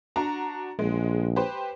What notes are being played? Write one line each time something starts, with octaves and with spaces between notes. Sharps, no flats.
D4 F#4 A#5
A#1 G#3
G4 B4 C5